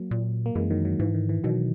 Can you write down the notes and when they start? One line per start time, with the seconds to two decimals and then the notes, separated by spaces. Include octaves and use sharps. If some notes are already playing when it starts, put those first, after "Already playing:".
Already playing: F#3 A#3
0.11 A#2
0.46 A#3
0.55 F#2 E3 G#3
0.70 D#3 F#3
0.85 D#3 F#3
0.99 G#2 E3
1.14 D#3
1.29 E3
1.44 B2 D#3 F#3